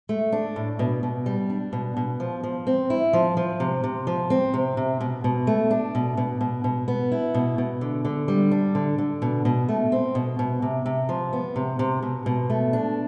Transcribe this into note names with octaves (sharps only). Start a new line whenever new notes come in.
A3
D4
A2
B2
B2
G3
D4
B2
B2
F3
F3
C4
E4
F3
F3
C3
C3
F3
C4
C3
C3
B2
B2
A3
D4
B2
B2
B2
B2
B3
E4
B2
B2
D3
D3
G3
D4
D3
D3
B2
B2
A3
C4
B2
B2
C3
C3
F3
B3
C3
C3
B2
B2
A3
D4